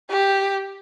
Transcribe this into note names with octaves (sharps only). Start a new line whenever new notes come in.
G4